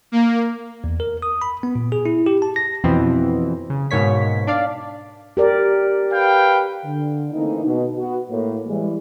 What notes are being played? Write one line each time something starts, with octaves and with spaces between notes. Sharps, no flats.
A#3
E2
A#4
D#6
B5
B3
A#2
G#4
E4
G4
A5
A#6
F2 B2 E3 B3 C4
C#3
G#2 B2 A#3 C#5 B6
D4 D5 F5
G4 A#4 D5
B4 F5 G5
D3
E3 A3 A#3 C4 D#4
B2
B3 F#4
A2 A#3
E3 G3 G#3